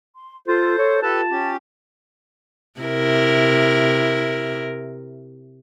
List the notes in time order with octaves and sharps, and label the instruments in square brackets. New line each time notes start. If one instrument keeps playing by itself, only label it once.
[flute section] C6
[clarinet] F4 [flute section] A4 [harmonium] C5
[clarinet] C#5
[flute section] F4 [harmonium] G4 A4 B4 [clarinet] A5
[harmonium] C#4 G4
[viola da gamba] C3 E4 A#4